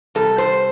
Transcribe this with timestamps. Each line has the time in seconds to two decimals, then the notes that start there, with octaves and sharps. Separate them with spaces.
0.15 C3 G3 A4
0.38 C5